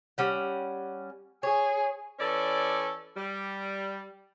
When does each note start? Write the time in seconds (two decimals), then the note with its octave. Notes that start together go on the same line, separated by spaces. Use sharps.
0.18 G3 C#4 F#5
1.43 G#4 C#5
2.19 E3 C#4 A4 C#5 D5
3.17 G3